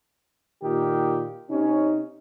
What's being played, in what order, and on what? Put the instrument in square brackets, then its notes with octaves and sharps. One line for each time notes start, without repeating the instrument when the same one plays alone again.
[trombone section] A#2 D#3 G4
[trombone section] C3 C#4 [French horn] D#4